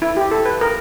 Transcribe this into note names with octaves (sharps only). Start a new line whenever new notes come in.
E4
G4
A4
B4
A#4